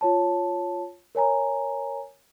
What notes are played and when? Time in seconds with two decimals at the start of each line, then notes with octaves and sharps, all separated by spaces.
0.01 F4 C#5 A5
1.15 A#4 C#5 G#5 A#5